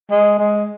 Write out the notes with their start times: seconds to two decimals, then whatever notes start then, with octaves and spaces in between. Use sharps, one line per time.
0.11 G#3
0.38 G#3